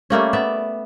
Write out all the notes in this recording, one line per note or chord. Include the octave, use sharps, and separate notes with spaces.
G3 A3 A#3 C#4
B3 D5 E5